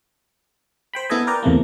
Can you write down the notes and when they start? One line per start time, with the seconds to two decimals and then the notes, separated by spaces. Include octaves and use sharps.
0.94 C5 G5 B5
1.10 B3 E4 A4 B4 D#5 G#5
1.27 A#4 B4 D5 G5 A#5
1.43 E2 C3 A3 A#3